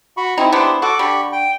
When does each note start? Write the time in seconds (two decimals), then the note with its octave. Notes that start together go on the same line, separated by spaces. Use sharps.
0.17 F#4 B5 C#6
0.38 C4 D#4 E4
0.52 B3 D4 E4 G4 C5
0.82 F#4 A4 D6
0.99 D3 G4 B5 C#6
1.32 G5